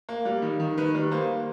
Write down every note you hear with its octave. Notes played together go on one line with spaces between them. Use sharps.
A#3
G3
D#3
D#3
D#3 B4
G3
A#3 C5